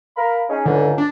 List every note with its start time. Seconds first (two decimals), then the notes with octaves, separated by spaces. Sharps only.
0.16 A#4 F5 B5
0.49 C#4 D#4 G#4
0.65 C#2 G#2 D3
0.98 D4